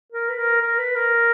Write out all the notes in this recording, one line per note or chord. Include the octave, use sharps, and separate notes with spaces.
A#4
B4
A#4
A#4
B4
A#4